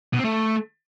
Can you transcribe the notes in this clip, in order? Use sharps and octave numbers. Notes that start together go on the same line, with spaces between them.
B2
C4
A3